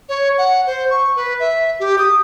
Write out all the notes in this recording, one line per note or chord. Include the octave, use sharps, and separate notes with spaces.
C#5
F#5
C5
C#6
B4
E5
G4
D#6